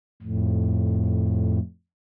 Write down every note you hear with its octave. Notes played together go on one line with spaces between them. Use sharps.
F2 A2